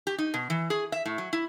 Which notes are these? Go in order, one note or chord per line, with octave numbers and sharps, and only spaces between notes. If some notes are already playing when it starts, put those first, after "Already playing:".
G4
D#4
B2
E3
G#4
E5
A2
F#3
E4